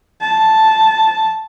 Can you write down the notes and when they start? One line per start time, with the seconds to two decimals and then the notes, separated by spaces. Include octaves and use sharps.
0.21 A5